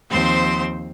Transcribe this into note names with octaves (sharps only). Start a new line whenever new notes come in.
D#2 F3 C4 C5 C6